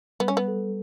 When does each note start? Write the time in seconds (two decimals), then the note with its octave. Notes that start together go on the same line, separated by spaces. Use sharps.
0.20 G3 B3
0.28 C#4
0.37 B3
0.48 A4